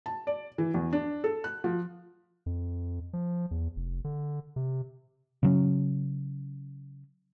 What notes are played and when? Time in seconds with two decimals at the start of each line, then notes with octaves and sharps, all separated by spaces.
0.06 A5
0.27 D5
0.58 E3
0.74 E2
0.93 D4
1.24 A4
1.44 F#6
1.64 F3
2.46 F2
3.13 F3
3.51 E2
3.76 F1
4.04 D3
4.56 C3
5.43 C#3 F#3 C#4